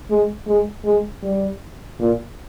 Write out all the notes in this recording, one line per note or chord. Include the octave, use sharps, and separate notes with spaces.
G#3
G#3
G#3
G3
A#2